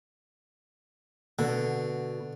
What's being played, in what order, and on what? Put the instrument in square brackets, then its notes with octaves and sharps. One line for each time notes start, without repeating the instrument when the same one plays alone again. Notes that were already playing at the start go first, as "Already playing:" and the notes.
[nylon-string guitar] B2 [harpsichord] D3